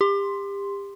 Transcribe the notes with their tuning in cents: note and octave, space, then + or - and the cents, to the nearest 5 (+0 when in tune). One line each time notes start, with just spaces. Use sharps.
G4 +30 C6 +0